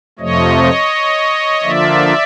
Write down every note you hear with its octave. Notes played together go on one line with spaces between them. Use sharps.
F2 C3 F3 A3 C#5 D#5
D3 F3 A#3 D4 F4 D5 E5